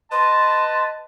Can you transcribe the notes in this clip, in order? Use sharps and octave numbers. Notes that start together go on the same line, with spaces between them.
B4 D#5 A5 C6